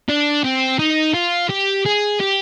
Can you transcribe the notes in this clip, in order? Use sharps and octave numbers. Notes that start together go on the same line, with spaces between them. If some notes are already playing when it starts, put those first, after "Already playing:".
D4
C4
D#4
F4
G4
G#4
G4